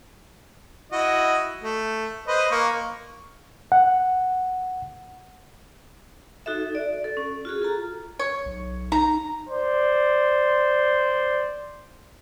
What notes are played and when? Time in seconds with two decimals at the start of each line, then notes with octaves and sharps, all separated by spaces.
0.92 E4 F#4 D#5
1.63 A3
2.27 B4 C5 D#5
2.51 A#3 C#6
3.72 F#5
6.46 D#4 F#4 A4 E5
6.75 D5
7.04 A4
7.17 C#4
7.45 F4 F#4 G#4
7.62 F4 A4 A#5
8.19 C#5
8.46 B1
8.92 D#4 A#5
9.49 C5 D5